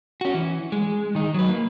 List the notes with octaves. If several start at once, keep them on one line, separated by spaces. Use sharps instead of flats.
C#4 F#4
E3
G#3
D#3 D#4
F#3 B4
A#3